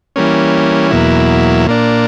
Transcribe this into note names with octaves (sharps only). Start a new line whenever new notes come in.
E3 G3 A#3 C#4
E2 B2 F#3 A#3 E4
A#2 A#3 D4